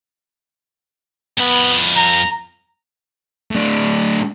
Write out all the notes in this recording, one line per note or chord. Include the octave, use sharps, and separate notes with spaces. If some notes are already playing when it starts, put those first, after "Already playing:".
F2 B3 B5
A#5
A2 D4